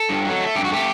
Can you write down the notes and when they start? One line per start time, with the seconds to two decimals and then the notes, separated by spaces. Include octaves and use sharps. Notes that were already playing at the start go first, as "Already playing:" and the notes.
Already playing: A4
0.09 G2
0.25 F#3
0.40 A3
0.56 G2 G4
0.65 F#4
0.71 A3 G4